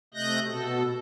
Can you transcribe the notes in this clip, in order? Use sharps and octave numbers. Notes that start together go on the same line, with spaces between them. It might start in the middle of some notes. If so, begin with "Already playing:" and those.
C3 A3 D#5 F#6 G6 A#6
B2 A4